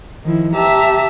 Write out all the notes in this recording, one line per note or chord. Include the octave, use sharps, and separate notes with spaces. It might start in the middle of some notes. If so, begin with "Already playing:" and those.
D#3 F3 E4
G4 E5 A5 A#5 E6